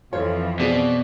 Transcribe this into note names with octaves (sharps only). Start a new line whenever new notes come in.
F2 E3 F3 F4 A4 C5 C#5
B2 C4 G#4 D5